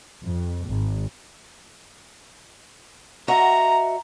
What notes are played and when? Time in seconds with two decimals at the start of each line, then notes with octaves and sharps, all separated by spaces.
0.22 F2
0.67 G#1
3.28 F#4 D#5 E5 A#5